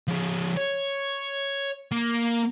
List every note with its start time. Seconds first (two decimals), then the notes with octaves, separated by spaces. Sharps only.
0.08 F3 G#3
0.57 C#5
1.92 A#3